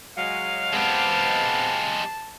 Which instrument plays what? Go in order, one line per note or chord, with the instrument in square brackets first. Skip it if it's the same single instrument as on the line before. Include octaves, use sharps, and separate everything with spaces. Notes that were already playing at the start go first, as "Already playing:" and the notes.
[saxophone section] F#3 G#3 [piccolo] F5
[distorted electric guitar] G#3 G4 [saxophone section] B3 C4 [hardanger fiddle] A5